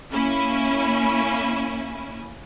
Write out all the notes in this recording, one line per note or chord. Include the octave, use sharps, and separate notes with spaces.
A#3 C#4 E4 G#5